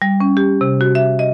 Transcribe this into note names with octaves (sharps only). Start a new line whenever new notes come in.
G3
C#4
G4
C3
F#4
E5
D#5